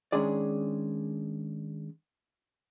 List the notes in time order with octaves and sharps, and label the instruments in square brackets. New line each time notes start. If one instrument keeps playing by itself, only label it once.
[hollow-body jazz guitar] D#3 G#3 C#4 D4 G#4 D5